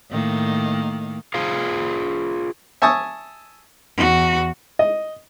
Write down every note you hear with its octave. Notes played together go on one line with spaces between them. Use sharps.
A2 D#3 A#3
F4 G#4 C5 F5
E5 G#5 A5 C#6 D#6
E2 F#4
D#5